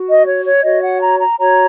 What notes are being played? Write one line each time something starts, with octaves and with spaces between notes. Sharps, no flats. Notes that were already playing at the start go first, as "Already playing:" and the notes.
Already playing: F#4
D#5
C#5
C#5
F#4 C#5 D#5
F#5
A#5
A#5
F#4 C#5 A#5